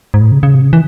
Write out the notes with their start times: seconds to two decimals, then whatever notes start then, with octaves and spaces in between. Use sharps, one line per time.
0.14 G#2
0.21 A2
0.32 C#3
0.43 C#3
0.55 C3
0.63 C#3
0.73 E3